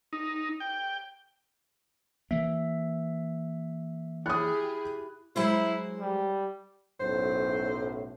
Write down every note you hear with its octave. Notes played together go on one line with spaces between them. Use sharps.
D#4
G5
E3 A#3 E5
E4 G4 G#4 D#6 F#6
F#3 G#3 E4 C5
G3
B1 F#2 A2 C5